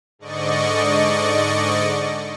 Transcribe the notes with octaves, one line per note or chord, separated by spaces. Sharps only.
G#2 D3 D5 D#5 C#6